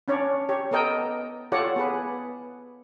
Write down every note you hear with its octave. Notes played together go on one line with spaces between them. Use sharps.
C#4 D4 C#5 D5
G4 C#5
B3 A4 A#4 D#5 G5
F4 G4 A4 C#5 D5 F#5
B3 G#4 B4